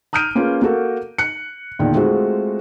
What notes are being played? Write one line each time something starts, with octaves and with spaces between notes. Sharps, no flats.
A#5 D#6 F6 G6 D7 D#7
A#3 C#4 F4 G#4 B4
A#3 F#4 A4 A#4
F#6 C#7
E2 A#2 D3 D#3
G#3 A3 C4 F4 F#4